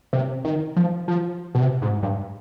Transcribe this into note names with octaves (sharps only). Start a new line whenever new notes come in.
C3
D#3
F3
F3
B2
C3
G#2
G2